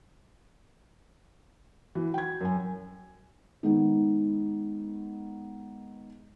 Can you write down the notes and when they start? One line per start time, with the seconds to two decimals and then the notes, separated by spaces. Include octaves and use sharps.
1.95 E3 F#4
2.14 G5 G#6
2.41 F#2 G#5
3.63 D#3 G#3 B3 D#4